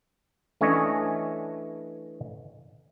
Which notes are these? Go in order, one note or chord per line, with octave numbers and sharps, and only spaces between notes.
E3 A3 C#4 D4 C#5 D#5